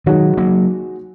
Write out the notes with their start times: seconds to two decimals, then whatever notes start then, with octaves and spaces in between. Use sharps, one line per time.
0.06 D#3 F#3 G#3 D#4 F#4 C#5
0.37 F#3 A#3